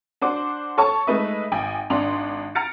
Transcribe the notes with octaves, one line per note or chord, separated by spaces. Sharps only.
D4 F#4 C5 D6
A4 C#5 A5 C#6
G#3 A3 D#4 B4 E5
G#1 G5 G#5
G#1 D4 C6 F7
A#5 F6 A6 C#7 D7